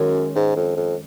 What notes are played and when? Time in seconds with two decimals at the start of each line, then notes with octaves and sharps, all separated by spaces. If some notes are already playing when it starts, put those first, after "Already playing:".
Already playing: F#2 D#3 G#3 C#4
0.36 G#2
0.56 F2
0.77 F2